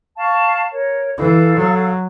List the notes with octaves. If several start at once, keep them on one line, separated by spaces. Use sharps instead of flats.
F5 A5 C#6
A#4 C#5
E3 A4 F5
F#3